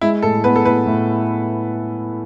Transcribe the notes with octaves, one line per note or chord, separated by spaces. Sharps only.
G#3 E4
A2 A4
B3 B4
A4
A2 B4
A2